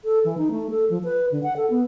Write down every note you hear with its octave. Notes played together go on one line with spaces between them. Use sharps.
A4
E3
D#4
A3
A4
F3
B4
D3
F#5
A4
B3